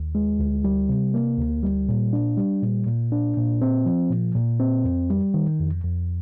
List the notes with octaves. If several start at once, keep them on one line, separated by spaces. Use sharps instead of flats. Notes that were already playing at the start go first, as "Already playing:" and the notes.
Already playing: D#2
G#3
D2
G3
C3
A#3
D2
G3
A#2
D4
G3
A#2
A#2
D4
A#2
C4
F3
A#2
A#2
C4
F2
G3
D#3
F2
F2